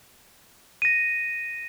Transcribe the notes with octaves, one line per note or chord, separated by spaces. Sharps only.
A#6 D#7